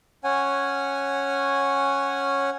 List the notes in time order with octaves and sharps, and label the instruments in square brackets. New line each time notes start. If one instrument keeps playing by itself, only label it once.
[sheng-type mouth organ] C#4 C#5 F#5 G#5